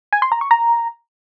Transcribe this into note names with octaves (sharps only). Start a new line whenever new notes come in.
G#5
C6
A#5
C#6
A#5